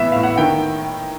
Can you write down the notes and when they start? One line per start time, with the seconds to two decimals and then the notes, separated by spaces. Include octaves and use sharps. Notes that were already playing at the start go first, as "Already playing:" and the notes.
Already playing: A2 E3 B3 E5
0.12 A2 F5
0.23 F#5
0.38 D#3 G5